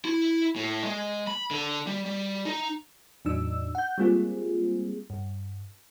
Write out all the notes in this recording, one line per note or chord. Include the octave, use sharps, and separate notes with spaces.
E4
A2
G#3
B5
D3
G3
G3
D#4
E2 A2 F#3 D4 D#4 E6
F#5 G6
G3 G#3 A#3 C4 F4 G#4
G2